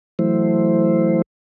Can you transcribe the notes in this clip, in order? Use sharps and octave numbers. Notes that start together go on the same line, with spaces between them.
E3 F#3 A3 E4 C5